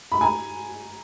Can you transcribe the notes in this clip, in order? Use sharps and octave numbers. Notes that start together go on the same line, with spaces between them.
B5
G#5 A#5